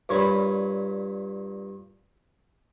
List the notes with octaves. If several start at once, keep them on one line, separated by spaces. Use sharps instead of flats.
G2 A#2 C#5 B5